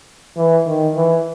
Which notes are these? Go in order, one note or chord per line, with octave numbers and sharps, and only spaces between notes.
E3
D#3
E3